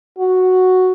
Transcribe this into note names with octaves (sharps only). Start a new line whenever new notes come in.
F#4